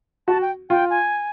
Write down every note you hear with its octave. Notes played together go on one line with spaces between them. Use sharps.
F#4 A5
G5
F4 G5
G#5